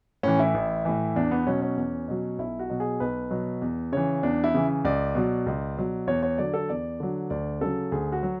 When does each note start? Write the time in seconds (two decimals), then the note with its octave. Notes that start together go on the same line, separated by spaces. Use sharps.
0.23 A2 E3 C#4
0.39 E4
0.54 A1
0.85 A2 E3
1.16 E2 D4
1.31 B3
1.47 B2 F#3 C#4
1.62 C#4
1.77 E2
2.08 B2 F#3
2.39 B1 E4
2.59 F#4
2.70 B2 F#3
2.80 G#4
3.00 B1 B4
3.31 B2 F#3
3.62 E2
3.92 C#3 E3 C#5
4.23 E2 D4
4.44 E4
4.54 C#3 E3
4.85 C#2 D5
5.15 B2 F#3
5.46 C#2
5.77 B2 F#3
6.07 E2 C#5
6.23 C#5
6.38 D3 F#3 D5
6.54 A4
6.69 E2 D5
7.00 D3 F#3
7.30 D2 D5
7.61 C#3 F#3 A4
7.92 D2 G#4
8.12 F#4
8.23 F#3